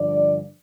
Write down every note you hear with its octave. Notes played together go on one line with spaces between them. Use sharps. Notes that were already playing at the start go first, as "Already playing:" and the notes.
Already playing: G2 D3 F3 D5